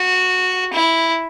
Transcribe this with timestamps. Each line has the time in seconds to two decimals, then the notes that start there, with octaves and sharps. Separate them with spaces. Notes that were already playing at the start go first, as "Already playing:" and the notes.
Already playing: F#4
0.73 E4